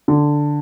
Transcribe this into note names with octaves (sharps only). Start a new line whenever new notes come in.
D3